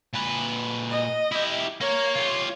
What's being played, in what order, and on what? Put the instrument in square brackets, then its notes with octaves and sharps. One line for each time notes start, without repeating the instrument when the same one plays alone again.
[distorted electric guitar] A#2 B4
[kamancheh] D#5
[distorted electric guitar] E4 G4
[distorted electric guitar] A#3 A#4 [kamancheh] C#5
[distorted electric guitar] F4 G4